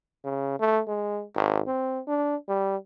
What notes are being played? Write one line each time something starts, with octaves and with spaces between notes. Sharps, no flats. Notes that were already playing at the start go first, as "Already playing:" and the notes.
C#3
A3
G#3
G#1
C4
D4
G3